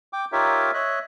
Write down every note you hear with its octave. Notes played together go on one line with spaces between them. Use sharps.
G5 D6
D#4 F4 G4 A#4 C#5 E5
C#5 D#5 E5 F#6